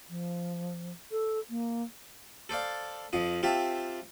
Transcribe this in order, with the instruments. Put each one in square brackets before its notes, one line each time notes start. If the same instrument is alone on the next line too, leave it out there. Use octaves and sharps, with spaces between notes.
[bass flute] F3
A4
A#3
[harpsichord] A4 C5 D5 F5
F2 F3 D#5
C4 F4 G4 E5 A5